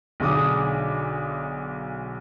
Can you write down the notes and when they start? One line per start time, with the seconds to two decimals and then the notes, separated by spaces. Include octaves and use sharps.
0.20 B1 D3 G#4 D6 D#6